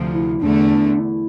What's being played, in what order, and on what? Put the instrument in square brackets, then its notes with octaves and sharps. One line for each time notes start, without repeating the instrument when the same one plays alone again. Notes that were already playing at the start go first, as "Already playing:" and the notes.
Already playing: [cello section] D2 C3 F3
[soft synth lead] E4
[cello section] E2 D3 A3 [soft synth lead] D4
[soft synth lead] E4